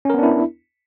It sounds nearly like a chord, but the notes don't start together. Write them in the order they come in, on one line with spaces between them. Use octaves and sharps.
C#4 A#4 B3 D4 E4